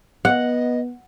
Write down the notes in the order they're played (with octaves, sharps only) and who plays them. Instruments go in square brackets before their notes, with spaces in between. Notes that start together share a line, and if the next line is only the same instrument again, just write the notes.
[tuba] B3 [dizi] D#5 [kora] F#5